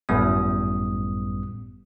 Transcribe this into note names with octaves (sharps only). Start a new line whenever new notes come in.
G#1 F#2 A2 G3 B3 D#6